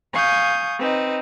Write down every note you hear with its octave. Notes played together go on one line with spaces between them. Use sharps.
F5 G#5 C#6 D#6 G6
C4 D#4 B4